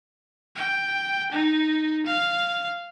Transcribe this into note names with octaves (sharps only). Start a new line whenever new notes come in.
G5
D#4
F5